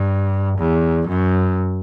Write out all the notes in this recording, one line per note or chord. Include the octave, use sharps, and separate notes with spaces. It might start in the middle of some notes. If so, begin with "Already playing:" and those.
Already playing: G2
E2
F#2